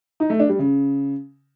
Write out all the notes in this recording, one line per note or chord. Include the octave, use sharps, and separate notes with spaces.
D#4
A3
D4
G3
C#3